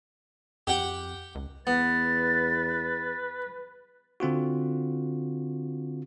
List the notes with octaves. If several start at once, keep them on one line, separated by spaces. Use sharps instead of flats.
F2 G4 F#5 G5
C#2
E2 B3 B4 A6
D3 C4 F4 F#4